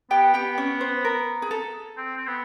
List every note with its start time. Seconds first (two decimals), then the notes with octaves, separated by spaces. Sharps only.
0.11 B3 G4 G5
0.34 G4 G5
0.58 C#4 C#5
0.81 C5
1.04 A#4
1.42 G#4
1.51 A4
1.97 C4
2.17 C4
2.27 B3